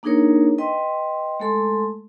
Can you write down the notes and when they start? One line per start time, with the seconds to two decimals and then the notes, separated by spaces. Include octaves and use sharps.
0.03 A#3 D4 D#4 G#4 A#4 C#5
0.58 B4 D#5 G5 C6
1.40 G#3 A3 A4 C6